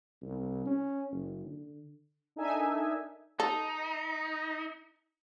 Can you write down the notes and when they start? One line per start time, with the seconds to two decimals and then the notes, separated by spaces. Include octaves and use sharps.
0.22 C2
0.66 C#4
1.12 F#1
1.45 D3
2.36 D4 D#4 A4 A#4 E5 G#5
3.40 D#4 A4